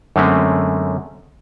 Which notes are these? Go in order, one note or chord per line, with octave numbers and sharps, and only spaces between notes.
F#2 D3 G#3 A3 C4 C#4